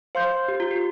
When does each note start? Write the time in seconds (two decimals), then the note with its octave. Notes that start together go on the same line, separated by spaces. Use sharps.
0.15 C5 F5 C6 G6
0.48 G4
0.60 F4
0.71 G4